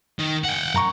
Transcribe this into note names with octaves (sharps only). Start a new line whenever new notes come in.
D#3
F#5 G5
F#2 A#5 C#6